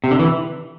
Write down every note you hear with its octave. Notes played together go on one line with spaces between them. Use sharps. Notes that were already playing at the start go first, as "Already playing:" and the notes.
C3
D3
E3